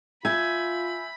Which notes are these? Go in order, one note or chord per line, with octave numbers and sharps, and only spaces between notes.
F4 E5 G#5 B5 E6 G6